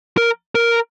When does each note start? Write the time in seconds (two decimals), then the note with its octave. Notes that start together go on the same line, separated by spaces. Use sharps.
0.17 A#4
0.55 A#4